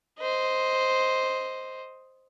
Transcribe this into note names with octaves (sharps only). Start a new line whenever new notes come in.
C5 D#5